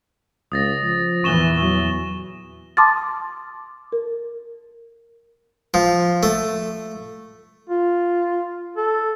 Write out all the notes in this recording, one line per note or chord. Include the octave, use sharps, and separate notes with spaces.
C#2 D#6 A6 A#6
F3
E2 A#2 E3 C#6 E7 G7
F#3
A5 C6 D6 D#6 F6 A6
A#4
F3
A3
F4
A4